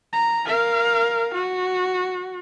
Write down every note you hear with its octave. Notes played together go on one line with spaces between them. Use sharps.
A#5
A#4 F5
F#4